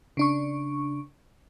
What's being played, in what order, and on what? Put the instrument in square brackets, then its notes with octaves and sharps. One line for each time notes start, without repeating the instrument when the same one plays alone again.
[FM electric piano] C#3 D4 C#6